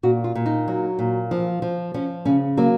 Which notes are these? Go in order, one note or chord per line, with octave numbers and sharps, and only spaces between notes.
A#2 F#4
F4
A#2
D#4
F#3
A#2
F3
F3
F3 C#4
C#3 C#4
F#3 A#3